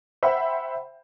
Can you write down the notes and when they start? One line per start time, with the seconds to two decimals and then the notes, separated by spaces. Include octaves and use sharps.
0.23 C5 E5 F#5 G5 B5